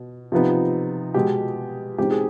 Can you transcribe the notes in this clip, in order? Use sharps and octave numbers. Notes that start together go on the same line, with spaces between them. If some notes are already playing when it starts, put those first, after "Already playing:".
Already playing: B2
C3 F3 B3 D#4
B2 G#3 B3 G4
B2 G#3 C4 D#4 G4
G#4